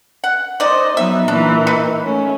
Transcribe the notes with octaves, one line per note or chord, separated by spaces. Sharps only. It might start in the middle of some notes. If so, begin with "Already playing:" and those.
F#5
D#4 C5 D5 D#5
F#3 B3 D#4 E5
A#2 E3 D4 A#4
D#4 B4
A3 C#4